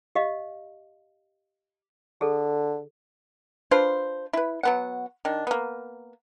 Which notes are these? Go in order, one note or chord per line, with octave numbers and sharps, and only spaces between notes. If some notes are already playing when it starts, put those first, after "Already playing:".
G4 D#5 F5
D3 G#4 A4
D4 F4 B4 C5
E4 B4
F#3 B3 F#5
D#3 D4
A#3 B3